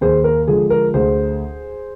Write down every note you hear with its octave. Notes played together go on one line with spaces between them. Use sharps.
D#2 G#4 C5
A#4
D3 F3 G#3 G#4
A#4
D2 G#4 C5